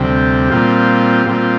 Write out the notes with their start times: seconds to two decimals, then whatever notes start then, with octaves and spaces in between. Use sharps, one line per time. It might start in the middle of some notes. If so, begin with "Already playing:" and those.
Already playing: D2 C3 G3
0.51 A#2 G3 C4 F4
1.27 A#2 G3 C4 F4